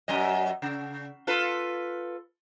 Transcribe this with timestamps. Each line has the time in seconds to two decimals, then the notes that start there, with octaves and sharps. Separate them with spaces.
0.08 F#2 F#3 D#5
0.62 C#3
1.27 F4 A4 B4